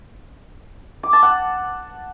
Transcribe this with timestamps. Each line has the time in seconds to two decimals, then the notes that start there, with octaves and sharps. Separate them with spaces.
1.03 D6
1.13 A5
1.22 F#5